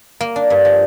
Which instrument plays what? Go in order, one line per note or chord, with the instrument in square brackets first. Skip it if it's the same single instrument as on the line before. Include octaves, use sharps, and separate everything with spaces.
[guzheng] A#3
D4
G2
F3